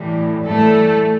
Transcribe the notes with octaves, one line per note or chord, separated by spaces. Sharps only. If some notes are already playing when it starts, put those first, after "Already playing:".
Already playing: A2 E3 G3
A2 E3 G3 A3 A4